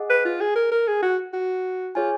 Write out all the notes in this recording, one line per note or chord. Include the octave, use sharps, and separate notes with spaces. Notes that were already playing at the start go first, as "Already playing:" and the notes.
Already playing: G#4 D#5 F#5
B4
F4
G#4
A#4
A#4
G#4
F#4
F#4
F4 G#4 C#5 G#5